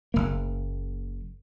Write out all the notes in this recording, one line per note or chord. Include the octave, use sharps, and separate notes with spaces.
F#1 A#3